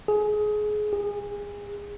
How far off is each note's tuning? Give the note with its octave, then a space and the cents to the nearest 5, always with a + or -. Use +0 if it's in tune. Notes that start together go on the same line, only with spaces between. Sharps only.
G#4 +25
G#4 -25